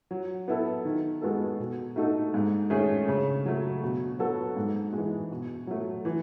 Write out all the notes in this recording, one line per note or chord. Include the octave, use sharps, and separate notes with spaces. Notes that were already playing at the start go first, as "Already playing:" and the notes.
F#3
B3 E4 A4
D#3
G#3 B3 F#4 A4
B2
A3 D#4 F#4 A4
G#2
D#3 A3 C#4 G#4
C#3
F#3 A3
B2
F#3 B3 F#4 A4
G#2
E3 G#3
B2
F#3 A3
E3